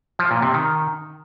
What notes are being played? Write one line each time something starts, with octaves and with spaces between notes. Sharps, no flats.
F3
A#2
C3
D#3